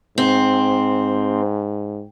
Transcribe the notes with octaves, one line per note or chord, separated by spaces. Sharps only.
G#2 C4